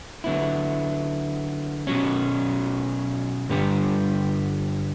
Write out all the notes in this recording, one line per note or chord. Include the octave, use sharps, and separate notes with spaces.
D3 F#3 B3 E4
B2 F#3 C#4
G2 D3 G3 B3